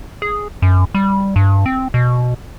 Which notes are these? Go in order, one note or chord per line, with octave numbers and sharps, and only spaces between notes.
G#4
F#2
G3
G2
C4
B2